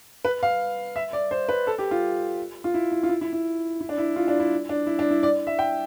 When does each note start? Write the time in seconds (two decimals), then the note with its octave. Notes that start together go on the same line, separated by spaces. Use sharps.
0.25 B4
0.43 F5
0.96 E5
1.13 D5
1.31 C5
1.49 B4
1.67 A4
1.78 G4
1.91 F4
2.64 F4
2.74 E4
2.92 E4
3.03 F4
3.09 E4
3.21 E4
3.33 E4
3.81 E4
3.89 D4
3.98 E4
4.16 F4
4.28 D4
4.40 E4
4.69 D4
4.87 E4
4.99 D4
5.11 E4
5.23 D5
5.47 E5
5.59 G5